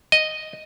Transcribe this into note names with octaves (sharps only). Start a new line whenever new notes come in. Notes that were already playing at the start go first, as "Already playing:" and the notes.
D#5